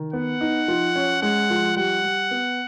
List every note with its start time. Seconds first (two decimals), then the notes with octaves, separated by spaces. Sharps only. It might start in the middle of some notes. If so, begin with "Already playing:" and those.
Already playing: D#3
0.13 B3 F#5
0.41 D#4
0.68 F3
0.96 C#4
1.22 G#3 F#5
1.50 F3
1.76 G3 F#5
2.04 G3
2.31 B3